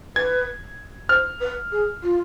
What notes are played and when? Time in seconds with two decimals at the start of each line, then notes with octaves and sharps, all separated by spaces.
0.16 B4 G#6
1.09 C5 F6
1.40 B4
1.72 G#4
2.03 F4